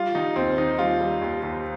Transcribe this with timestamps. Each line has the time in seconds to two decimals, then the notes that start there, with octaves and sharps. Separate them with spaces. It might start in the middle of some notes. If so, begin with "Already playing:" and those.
Already playing: G3 F4
0.15 D#3 D#4
0.36 D#2 C4
0.58 D#3 D#4
0.79 G3 F4
1.00 G3
1.22 D#2
1.43 D#2